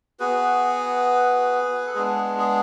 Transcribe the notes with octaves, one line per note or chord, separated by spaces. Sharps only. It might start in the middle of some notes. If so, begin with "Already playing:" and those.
B3 F#4 G#4 B4
A4
G#3 B3 D4 G#4
G#4